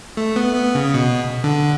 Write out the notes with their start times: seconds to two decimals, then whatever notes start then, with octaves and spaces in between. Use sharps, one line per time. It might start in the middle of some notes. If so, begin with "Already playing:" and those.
0.17 A3
0.36 B3
0.55 B3
0.75 C#3
0.94 B2
1.44 D3